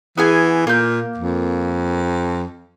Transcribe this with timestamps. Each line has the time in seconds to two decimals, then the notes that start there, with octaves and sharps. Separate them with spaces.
0.18 E3 B3 G#4 G#5
0.67 A#2 A#3 G6
1.18 F2